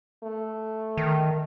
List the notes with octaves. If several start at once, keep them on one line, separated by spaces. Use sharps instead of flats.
A3
D#3